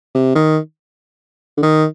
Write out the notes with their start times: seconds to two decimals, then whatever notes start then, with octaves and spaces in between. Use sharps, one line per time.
0.15 C3
0.35 D#3
1.57 D3
1.62 D#3